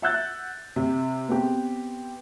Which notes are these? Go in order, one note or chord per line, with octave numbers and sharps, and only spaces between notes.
E5 F#5 E6 F#6 G6 A6
C3
B3 C4 G4